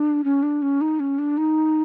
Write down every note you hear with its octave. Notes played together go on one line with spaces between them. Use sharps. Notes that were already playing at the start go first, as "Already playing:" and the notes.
Already playing: D4
C#4
D4
C#4
D#4
C#4
D4
D#4